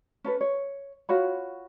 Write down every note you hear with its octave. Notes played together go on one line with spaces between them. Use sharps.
C#4 A4 B4
C#5
F4 F#4 C#5 B5